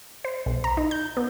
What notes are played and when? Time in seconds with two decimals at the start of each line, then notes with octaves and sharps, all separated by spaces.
0.24 C5
0.46 B1
0.64 A#5
0.77 D#4
0.91 G6
1.17 B3